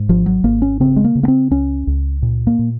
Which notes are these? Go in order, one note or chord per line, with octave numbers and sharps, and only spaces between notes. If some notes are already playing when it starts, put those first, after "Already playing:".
Already playing: G#2
G#1 F3
F#3
G#1 A#3
C#4
C#3 C4
G#3
A#3
C#3
A#3
C4
C#2 C#4
C#2
A#2
A#3
A#2